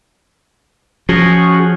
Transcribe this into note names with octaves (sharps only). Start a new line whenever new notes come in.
F3 C#4 F#4 G#4